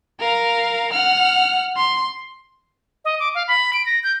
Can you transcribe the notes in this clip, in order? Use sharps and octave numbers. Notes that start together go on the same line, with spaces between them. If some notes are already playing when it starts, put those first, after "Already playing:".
A#4 F5
F#5 F6
C6
D#5
D6
F5
B5
D7
A#6
G6